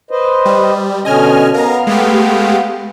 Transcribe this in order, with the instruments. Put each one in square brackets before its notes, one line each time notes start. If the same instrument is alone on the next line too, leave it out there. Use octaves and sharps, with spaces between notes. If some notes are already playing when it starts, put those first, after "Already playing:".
[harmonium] B4 C5 D#5
[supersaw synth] G3
[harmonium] B2 D3 C#4 [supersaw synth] D#5 G#5 F6
[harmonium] B3 F5 [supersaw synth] A#4 A#5
[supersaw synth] G#3 A3 G4